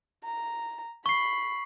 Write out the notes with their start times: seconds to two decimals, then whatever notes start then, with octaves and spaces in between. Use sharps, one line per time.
0.24 A#5
1.06 B5 C#6 C7